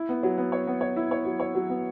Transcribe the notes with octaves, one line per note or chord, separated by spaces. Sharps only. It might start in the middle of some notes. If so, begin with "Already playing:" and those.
Already playing: E4
B3
F#3
B3
C#5
B3
C#5
E4
C#5
F#3
C#5
F#3
B3